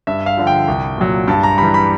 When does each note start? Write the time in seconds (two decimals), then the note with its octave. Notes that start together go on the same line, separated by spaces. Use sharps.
0.07 G2 E5
0.26 F5
0.37 D3 F3
0.47 G5
0.68 C2
0.98 A#2 F#3
1.27 G2 A5
1.43 A#5
1.58 E3 G3 B5
1.74 B5